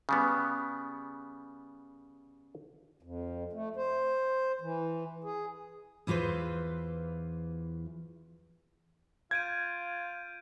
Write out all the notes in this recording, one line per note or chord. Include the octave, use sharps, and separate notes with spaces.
C#3 G3 B3
F2
A3
C5
E3
G#4
E2 E3 F4 B4 C5
F4 G6 G#6 D7 D#7